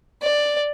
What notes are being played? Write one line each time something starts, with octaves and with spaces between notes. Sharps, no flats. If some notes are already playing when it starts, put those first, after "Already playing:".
D5